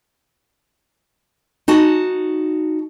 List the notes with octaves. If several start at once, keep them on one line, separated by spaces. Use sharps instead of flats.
D#4 F#4 A5